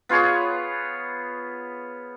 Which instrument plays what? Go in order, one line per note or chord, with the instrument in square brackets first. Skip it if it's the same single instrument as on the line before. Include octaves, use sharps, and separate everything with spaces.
[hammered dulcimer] B3 F4 G#4 C#5